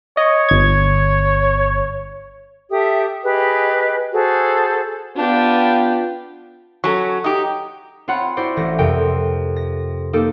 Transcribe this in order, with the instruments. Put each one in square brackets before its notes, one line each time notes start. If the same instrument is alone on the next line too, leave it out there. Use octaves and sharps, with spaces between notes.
[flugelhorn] C#5 [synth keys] D#5
[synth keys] G1 G#6
[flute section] G4 A4 E5 D#6
G4 G#4 B4 D#5
F#4 G#4 A4 C5
[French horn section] B3 F4 [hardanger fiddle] D4 G4
[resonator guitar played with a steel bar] F#3 C#4 [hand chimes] A4 C#6
[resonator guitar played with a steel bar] D#4 G4 [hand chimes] D#6
[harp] C4 F4 C#5 F#5 B5
E4 F#4 C5 D5
A1 A3 A#6
F2 C3 A#4 G5
A#6
A#3 D#4 G4 A4